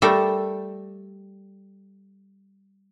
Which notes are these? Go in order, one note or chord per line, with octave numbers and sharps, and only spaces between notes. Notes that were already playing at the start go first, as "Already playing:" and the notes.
G3 A3 A4 A#4